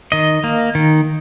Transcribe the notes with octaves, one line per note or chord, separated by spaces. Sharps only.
D#3 D#5
A#3
D#3